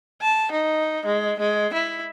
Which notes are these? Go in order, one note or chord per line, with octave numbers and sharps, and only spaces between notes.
A5
D#4
G#3
G#3
E4